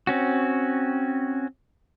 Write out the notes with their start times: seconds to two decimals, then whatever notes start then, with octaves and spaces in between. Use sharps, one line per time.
0.07 C4 C#4 F#4